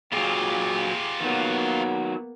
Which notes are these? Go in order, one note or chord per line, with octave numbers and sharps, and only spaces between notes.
A#2 F#3 F4 G4 G#4
D#3 F#3 A#3 B3